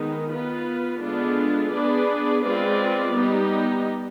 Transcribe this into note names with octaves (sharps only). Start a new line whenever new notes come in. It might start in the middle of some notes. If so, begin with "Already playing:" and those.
Already playing: D#3 G#3 B3 D#4
B3 F4 B4
D3 G#3 B3 D4 F4
B3 D4 G#4 B4 D5
G#3 C4 F4 B4 D5
G3 B3 D#4 G4